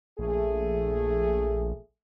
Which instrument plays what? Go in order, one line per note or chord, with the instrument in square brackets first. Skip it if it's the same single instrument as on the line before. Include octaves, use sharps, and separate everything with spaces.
[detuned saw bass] A#1 [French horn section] A3 G#4